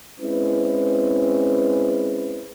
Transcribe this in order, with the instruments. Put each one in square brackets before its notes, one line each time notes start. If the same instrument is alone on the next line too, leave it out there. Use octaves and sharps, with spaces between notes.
[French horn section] G#3 C4 C#4 E4 B4